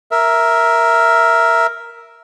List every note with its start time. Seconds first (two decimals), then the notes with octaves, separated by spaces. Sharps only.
0.11 A#4 E5